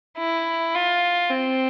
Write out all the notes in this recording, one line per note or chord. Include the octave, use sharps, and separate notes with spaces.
E4
F4
C4